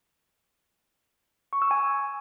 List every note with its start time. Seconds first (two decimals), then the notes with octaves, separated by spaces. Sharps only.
1.53 C#6
1.62 E6
1.71 G#5